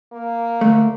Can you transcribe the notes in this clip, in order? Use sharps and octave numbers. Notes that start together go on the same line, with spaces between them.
A#3
D2 A3